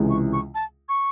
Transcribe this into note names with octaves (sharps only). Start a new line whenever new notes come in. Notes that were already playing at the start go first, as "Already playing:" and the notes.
Already playing: C#2 C3 E3 G#3 C#4
C#6
C#6
A5
C#6